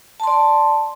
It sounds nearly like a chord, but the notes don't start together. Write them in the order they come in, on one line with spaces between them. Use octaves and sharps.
A5 C6 D5